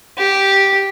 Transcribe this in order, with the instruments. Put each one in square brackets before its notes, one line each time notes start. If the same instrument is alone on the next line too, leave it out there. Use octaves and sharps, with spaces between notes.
[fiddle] G4